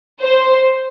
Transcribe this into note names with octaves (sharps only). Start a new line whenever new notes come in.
C5